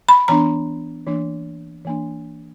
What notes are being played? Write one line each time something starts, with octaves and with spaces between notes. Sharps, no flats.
B5
E3 B3 D4 A#5
E3 A#3 D4
E3 A#3 D4